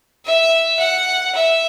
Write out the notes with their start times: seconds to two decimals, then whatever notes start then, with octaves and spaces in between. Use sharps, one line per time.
0.25 E5
0.79 F#5
1.35 E5